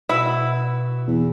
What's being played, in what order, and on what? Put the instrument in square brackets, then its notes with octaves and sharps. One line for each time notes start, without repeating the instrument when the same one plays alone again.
[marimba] B2 [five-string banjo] E4 [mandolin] F#4 B5 E6
[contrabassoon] E2